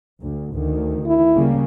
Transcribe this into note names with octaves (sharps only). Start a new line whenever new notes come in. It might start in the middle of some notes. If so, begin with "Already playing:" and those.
D2
D2 D#3
E4
C#3 G3 A#3